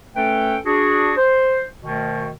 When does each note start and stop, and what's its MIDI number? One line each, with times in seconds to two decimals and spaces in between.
0.16 0.57 57
0.16 0.57 61
0.16 0.57 69
0.16 0.57 71
0.16 0.57 79
0.66 1.12 62
0.66 1.12 66
0.66 1.12 68
1.17 1.64 72
1.83 2.29 38
1.83 2.29 47
1.83 2.29 51